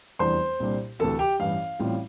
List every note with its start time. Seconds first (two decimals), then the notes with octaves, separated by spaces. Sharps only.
0.19 F1 E2 E3 G3 D4 C5 C6
0.60 C2 A#2 G3 D4
0.99 D2 C3 E3 A4 A5
1.19 G4 G5
1.40 A1 G2 E3 F5
1.80 A1 A2 G3 C4 F4